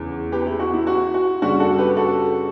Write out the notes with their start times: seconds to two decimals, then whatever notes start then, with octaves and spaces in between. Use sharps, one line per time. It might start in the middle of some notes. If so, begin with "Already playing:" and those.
Already playing: E2 C#3 E3
0.32 G4 B4
0.46 E4 G4
0.59 F#4
0.73 E4
0.87 F#4
1.14 F#4
1.42 F#2 C#3 G3 D4 F#4
1.60 F#4 A4
1.78 G4 B4
1.96 F#4 A4